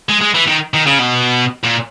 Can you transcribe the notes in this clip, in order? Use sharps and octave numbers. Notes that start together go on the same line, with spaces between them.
G#3
G#3
E3
D#3
D#3
C#3
B2
A#2